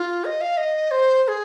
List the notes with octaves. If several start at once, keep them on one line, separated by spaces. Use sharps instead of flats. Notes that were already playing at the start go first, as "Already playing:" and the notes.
Already playing: F4
D#5
F5
D#5
C5
C5
G#4